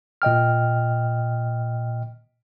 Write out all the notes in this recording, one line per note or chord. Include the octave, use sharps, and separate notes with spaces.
A#2 D#5 G5 F6